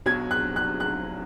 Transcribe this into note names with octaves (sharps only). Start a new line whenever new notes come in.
B1 B2 F#3 G#6
F#6
F#6
F#6